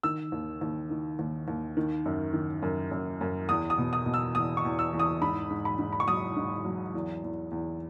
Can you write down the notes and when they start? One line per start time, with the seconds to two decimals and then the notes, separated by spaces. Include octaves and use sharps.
0.03 D#3 E6
0.32 D#2
0.61 D#2
0.90 D#3
1.19 D#2
1.48 D#2
1.77 D#3
2.06 F#2
2.33 D#3
2.62 F#2
2.91 F#2
3.21 F#2
3.49 E2 D#6
3.70 D#6
3.78 B2
3.93 D#6
4.06 B2
4.14 E6
4.35 E2 D#6
4.57 C#6
4.65 E2
4.79 E6
4.93 E2
4.99 D#6
5.21 G#2 B5
5.50 G#2
5.65 B5
5.79 G#2
5.93 B5
6.00 C#6
6.08 F#3 D#6
6.36 G#2
6.65 F#3
6.94 E2
7.23 E2
7.51 E2